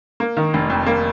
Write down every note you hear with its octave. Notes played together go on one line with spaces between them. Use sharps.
A#3
D#3
F1
F2
A#3